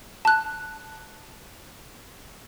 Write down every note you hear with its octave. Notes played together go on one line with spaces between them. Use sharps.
A5 F#6